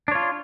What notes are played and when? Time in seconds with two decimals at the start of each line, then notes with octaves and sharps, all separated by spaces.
0.08 D4
0.12 C#5
0.15 F4